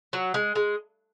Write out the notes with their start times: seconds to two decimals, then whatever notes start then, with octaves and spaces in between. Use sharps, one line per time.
0.13 F#3
0.34 G#3
0.55 G#3